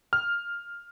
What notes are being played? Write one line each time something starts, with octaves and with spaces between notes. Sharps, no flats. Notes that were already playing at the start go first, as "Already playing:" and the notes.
F6